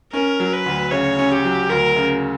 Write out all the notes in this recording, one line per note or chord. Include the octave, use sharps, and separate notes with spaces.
C#4 A#4
F#3
B4
D2
C#3 C#5
C#4
G4
F#3
D2 A#4
C#3